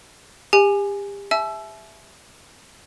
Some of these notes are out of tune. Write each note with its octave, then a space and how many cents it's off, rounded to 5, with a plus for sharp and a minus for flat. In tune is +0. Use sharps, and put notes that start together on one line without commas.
G4 +35 G#5 +0
E5 +0 A5 -45 E6 +20